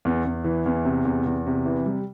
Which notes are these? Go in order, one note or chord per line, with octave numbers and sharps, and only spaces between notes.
E2
E2
E3
E2
C3
E2
E2
C3
E3
G3